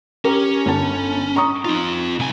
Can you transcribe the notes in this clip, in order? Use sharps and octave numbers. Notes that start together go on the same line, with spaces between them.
C#4 G4 A#4
G1 A5
A#5 C#6 D#6
C4 D#4 F4
C2 G#5